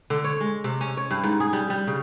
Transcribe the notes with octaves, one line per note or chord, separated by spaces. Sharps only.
D3
C#5
G#3
C3
C#4
C#5
G2
G#2
G#4
G3
G3
C#3